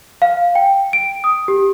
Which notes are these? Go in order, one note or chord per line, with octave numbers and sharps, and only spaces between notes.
F5
G5
D7
D#6
G4